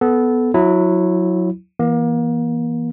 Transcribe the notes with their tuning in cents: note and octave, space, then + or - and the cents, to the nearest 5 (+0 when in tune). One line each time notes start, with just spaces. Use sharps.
B3 +5 A4 -20
F#3 -20 E4 +0
E3 +0 A#3 +35